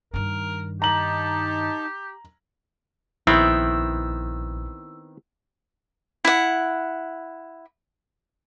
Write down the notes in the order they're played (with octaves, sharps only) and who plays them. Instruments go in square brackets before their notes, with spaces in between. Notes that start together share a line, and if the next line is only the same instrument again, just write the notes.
[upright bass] G2 D#3 [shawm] A#4
[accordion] D#4 A5 [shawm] G4 [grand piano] A#5 F#7
[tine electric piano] A#1 [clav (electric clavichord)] D#3 B3 C4 [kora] E4 [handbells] E6
[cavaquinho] E4 F#5